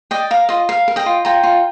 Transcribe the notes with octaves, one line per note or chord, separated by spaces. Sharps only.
D5 D#5 G5
A#4 F5
F4 D#5
A#4 F5
A#4
D#5 G5
F4
F4 G5 A#5
F4